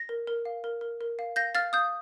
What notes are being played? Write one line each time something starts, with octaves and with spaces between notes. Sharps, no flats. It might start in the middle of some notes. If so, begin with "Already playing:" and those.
Already playing: A#6
A#4
A#4
F5
A#4
A#4
A#4
F5
F5 G6 A#6
F5 F6 A6
F5 D#6 G6